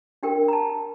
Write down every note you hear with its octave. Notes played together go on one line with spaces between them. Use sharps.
D4 G4 A#4 G5
A#5
A5